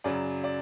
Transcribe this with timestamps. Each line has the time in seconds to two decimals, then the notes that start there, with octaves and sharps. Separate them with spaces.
0.04 F#2 C#3 F#3 D5
0.44 D5